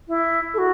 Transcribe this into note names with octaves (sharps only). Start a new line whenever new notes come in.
E4
A4
F#4